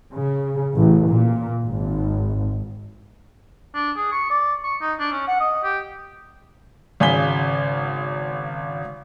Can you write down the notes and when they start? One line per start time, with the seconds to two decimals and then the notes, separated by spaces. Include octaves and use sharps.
0.13 C#3
0.76 A1
1.10 A#2
1.65 G#1
3.74 D4
3.96 G#4
4.12 C#6
4.30 D5
4.64 C#6
4.81 D#4
4.99 D4
5.11 C#4
5.27 F#5
5.40 D#5
5.64 G4
7.00 G#1 C#3 G#5 B6 G7